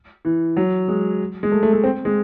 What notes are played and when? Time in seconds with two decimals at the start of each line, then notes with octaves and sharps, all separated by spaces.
0.25 E3
0.57 F#3
0.88 G#3
1.43 G#3
1.52 A3
1.63 A3
1.73 A3
1.84 C4
2.05 G#3